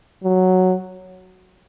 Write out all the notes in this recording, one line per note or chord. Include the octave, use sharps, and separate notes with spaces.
F#3